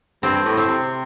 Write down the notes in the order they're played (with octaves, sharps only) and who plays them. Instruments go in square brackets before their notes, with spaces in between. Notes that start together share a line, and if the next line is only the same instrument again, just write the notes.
[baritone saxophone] G2 [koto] C4
[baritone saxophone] A2
[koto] C4
[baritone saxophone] C3